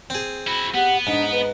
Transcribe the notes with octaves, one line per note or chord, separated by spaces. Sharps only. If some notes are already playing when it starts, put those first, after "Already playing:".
C4 G#4
E4 F#4 B5
B3 G4 F#5
G#2 D4 D#4
B4